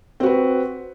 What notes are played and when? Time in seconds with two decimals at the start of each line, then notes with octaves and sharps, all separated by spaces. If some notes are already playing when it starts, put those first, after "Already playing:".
0.20 C4
0.23 F#4
0.26 B4